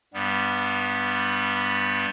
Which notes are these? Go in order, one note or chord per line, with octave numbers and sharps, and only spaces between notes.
G2 G3 B3